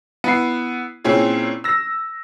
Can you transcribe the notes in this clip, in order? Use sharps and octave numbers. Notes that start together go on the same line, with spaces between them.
B3 E4 C7
A#2 C4 C#4 E4 G#4
E6 A#6